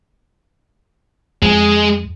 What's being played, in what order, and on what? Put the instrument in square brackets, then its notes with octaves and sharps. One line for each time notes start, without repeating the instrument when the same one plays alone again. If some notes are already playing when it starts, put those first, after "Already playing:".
[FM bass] F2 [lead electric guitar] G#3